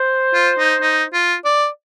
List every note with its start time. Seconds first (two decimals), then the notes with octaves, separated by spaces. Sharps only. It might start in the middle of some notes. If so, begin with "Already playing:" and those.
Already playing: C5
0.34 F4
0.58 D#4
0.82 D#4
1.13 F4
1.45 D5